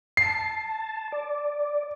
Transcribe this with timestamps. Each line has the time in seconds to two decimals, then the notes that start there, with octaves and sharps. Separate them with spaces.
0.17 A5 C7
1.12 D5